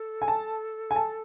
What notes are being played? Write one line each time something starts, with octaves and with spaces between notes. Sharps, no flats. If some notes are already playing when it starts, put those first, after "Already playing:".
Already playing: A4
G#5
A5
G#5
A5